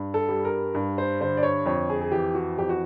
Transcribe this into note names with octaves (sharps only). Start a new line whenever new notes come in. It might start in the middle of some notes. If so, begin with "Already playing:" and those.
Already playing: G2
A4
G3
A#4
G2
C5
D3 C5
D5
C#5
F2 C#5
G#4
G#4
E3 G4
F#4
F2 G4
F#4